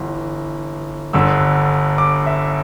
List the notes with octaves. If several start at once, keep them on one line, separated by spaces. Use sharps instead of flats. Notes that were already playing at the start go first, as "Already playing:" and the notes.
Already playing: G1 G2 E3
G1 G2 D3 E6
D6
E5